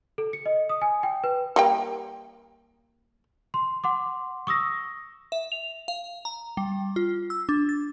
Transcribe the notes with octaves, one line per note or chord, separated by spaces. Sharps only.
A4
C#7
D#5
D#6
G#5
G5
B4
G3 A#3 G5
C6
F#5 C6 D6
C#6 D#6 E6 A#6
E5
F7
F5
A#5
G3
F4
E6
D4
A6